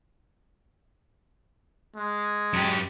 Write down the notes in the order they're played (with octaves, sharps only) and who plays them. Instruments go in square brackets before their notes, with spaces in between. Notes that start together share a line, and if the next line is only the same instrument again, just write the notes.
[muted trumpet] G#3
[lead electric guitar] F#2 G4